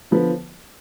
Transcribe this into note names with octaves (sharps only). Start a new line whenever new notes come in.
D3 F3 B3 F4 B4